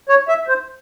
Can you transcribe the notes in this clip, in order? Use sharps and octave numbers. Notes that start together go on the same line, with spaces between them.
C#5
E5
C5